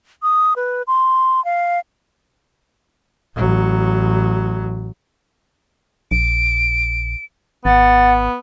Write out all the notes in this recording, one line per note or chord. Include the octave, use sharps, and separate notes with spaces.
D#6
B4
C6
F5
A1 F#3
A#1 D7
G#1 B3 F#5 A6